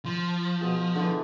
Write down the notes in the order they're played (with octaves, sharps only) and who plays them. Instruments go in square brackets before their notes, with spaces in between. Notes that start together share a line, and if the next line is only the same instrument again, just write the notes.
[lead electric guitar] F3 [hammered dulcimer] C6
[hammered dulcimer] B2 G#4
D3 E3